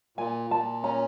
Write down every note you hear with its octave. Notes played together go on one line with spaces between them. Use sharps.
A#2 G#5
A#2 A5
C#4 A#5